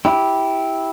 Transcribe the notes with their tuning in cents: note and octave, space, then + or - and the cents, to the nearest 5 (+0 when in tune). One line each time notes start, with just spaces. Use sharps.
E4 -10 G4 +0